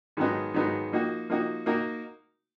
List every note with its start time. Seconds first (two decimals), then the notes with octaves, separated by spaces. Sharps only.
0.17 G#2 D#3 F#3 B3 D#4
0.54 G#2 D#3 F#3 B3 D#4
0.92 F3 A#3 D#4 F#4
1.30 F3 A#3 D#4 F#4
1.66 A#3 D#4 F#4 A#4